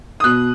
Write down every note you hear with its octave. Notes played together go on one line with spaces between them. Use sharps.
D#6
B2 F#6